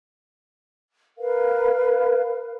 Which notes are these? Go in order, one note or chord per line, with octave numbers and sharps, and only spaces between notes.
A#4 B4 F5